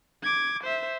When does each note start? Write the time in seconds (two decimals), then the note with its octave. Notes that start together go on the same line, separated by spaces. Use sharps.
0.23 D6 G#6
0.64 C5 E5